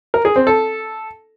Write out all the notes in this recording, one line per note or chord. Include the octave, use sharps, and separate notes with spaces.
A#4
G#4
C4
A4